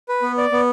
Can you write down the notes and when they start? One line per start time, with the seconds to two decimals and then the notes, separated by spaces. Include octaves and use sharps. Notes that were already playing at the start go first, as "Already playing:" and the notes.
0.09 B4
0.22 B3
0.38 D5
0.52 B3